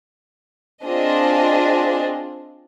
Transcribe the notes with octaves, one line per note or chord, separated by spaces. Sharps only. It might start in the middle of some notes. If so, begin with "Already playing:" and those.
C4 D4 F4 G#4 D#5